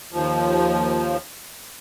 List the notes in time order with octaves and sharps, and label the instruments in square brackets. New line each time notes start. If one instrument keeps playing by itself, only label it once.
[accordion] D#2 F3